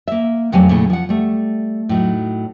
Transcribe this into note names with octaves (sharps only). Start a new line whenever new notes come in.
A#3 E5
F2 C3 F#3 A3 F5 G#5
A#2 C#3 A3 E4
F3 F#5
G3 A3
A2 F#3 D#4